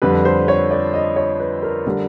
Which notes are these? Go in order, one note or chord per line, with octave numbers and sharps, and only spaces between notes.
F2 D3 G3 B4
C5
C#5
D5
D#5
C#5
B4
A#4
D3 G3